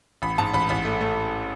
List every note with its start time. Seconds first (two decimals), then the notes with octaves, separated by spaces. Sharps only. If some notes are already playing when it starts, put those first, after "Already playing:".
0.22 A1 B5
0.38 G#2 A5
0.53 A1 B5
0.69 A1 B5
0.85 A3
1.01 A3